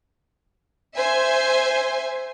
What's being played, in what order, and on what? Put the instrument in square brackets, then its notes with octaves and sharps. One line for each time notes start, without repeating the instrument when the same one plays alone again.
[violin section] C5 E5 G#5